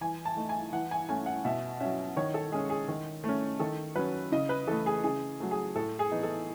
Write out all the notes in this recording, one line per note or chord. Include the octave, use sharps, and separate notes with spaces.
E3 G#5
A5
A3 D#4
G#5
E3 F#5
G#5
A3 C#4 G#5
F#5
B2 E5
F#3 C#4 E5
D#3 C#5
A4
G#3 C#4 G#4
G#4
D#3
A3 C#4
D#3 A4
F#3 C#4 B4
C#3 D#5
B4
E3 A3 A4
G#4
C#3 G#4
F#3 A3
G#4
A2 A4
G#4
E3 B3 D#4
A4